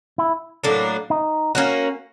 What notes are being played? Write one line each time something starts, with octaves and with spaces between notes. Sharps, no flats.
E4
A2 F#3 A#3 D4
D#4
A#3 C#4 F#4